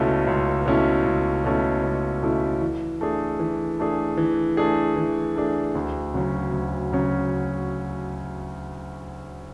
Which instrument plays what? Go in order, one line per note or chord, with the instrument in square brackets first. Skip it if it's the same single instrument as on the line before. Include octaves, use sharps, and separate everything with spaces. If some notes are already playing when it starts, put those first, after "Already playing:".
Already playing: [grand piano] C#2 B2 A3 C#4 E4
C#2
B2 A3 C#4 E4
C#2
B2 A3 C#4 E4
C#2
B2 A3 C#4 E4
E3
A3 D4 G#4
E3
A3 D4 G#4
E3
A3 D4 G#4
E3
A3 D4 G#4
D2
C#3 F#3 C#4
D2
C#3 F#3 C#4